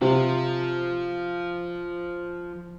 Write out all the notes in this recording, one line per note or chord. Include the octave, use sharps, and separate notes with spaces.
C3 F3